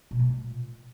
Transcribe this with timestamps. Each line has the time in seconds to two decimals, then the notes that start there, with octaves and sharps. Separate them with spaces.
0.11 B2
0.20 A3
0.28 A#2